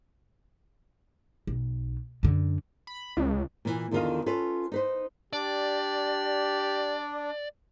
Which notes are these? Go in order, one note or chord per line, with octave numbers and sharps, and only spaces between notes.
B1
F#2 D3
B5
C#2
A#2 E3
E2 D3 D#3 F4 D#5 F5
C#4 F4 A4 B4
D#4 B4 C5
D4 G4 D5